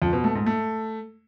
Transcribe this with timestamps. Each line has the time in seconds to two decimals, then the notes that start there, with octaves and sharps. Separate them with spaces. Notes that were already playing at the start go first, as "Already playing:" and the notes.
0.02 F2
0.13 B2
0.24 A3
0.35 G#2
0.46 A3